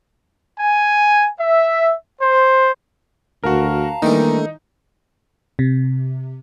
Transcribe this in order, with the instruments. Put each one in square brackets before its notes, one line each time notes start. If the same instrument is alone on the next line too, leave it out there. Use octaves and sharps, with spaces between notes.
[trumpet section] G#5
E5
C5
[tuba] D2 [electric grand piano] F#4 A#4 [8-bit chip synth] F5 A5 A#5
[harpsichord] D#3 E3 G3 [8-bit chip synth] A3 D4 A4 [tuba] A#3 [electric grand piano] D#4
[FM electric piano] C3